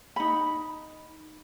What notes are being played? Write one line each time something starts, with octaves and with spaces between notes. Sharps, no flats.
D#4 B5